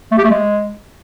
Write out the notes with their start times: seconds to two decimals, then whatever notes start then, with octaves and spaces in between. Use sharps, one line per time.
0.12 A3
0.18 G4
0.24 A3
0.30 G#3